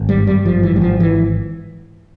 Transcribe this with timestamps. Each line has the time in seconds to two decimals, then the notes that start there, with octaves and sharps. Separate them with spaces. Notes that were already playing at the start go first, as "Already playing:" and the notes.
Already playing: G#1
0.09 G3
0.18 G2
0.27 G3
0.45 G#1 F3
0.63 E3
0.72 G#1 G3
0.82 F3
1.00 E3